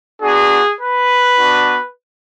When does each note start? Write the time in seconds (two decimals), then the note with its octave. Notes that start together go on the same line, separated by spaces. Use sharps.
0.22 B3 D4 F#4 G#4
0.80 B4
1.38 B3 D4 F#4